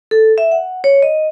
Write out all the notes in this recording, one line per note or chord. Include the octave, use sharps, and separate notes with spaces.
A4
E5
F#5
C#5
D#5